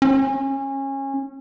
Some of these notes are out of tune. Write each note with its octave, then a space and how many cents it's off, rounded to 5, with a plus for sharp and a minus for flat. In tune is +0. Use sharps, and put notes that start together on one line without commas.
C#4 -25